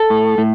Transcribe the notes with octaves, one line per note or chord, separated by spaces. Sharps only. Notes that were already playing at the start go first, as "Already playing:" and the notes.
Already playing: A4
A2
A2